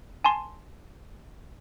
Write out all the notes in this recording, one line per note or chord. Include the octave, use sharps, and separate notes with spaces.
G#5 A5 C6